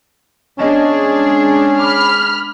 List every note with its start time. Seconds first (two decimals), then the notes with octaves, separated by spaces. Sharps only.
0.59 G#3 B3 C#4 D4 G#4 D#5 A5
1.79 B5 D6 F6